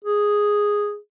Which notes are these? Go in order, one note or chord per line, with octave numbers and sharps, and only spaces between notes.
G#4